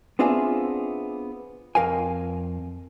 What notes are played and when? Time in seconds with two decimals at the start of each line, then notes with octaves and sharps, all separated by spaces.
0.19 B3 C4 D4 F4 G#4 E5
1.75 F2 A#4 F5 G5 G#5